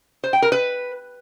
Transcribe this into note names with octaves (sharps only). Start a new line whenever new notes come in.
C5
G5
A#4
B4